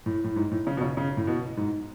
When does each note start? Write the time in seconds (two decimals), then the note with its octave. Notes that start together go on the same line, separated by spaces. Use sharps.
0.06 A2
0.24 A2
0.36 G#2
0.51 A2
0.67 C#3
0.77 B2
0.81 C#3
0.97 C#3
1.17 A2
1.27 B2
1.57 G#2